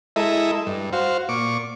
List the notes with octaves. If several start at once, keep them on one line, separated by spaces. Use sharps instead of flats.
G#3 E4 A4 D#5 E5 A#5
G2
F#4 C5 F5
A#2 C#6 D6